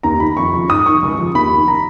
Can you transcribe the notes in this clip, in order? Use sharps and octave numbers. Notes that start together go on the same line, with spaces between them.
D#2 A#5
D#3 B5
F2 C#6
C#3 F3
G#2 D#6
D#3 C#6
C#2
C#3 F3
D#2 B5
D#3
A#5